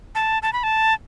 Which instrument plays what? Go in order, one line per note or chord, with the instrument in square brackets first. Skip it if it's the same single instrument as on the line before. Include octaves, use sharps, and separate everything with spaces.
[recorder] A5
A5
B5
A5